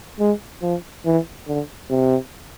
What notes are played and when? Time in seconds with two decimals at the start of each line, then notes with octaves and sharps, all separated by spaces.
0.19 G#3
0.62 F3
1.05 E3
1.47 D3
1.90 C3